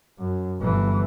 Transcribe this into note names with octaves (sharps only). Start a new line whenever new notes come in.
F#2
G1 E3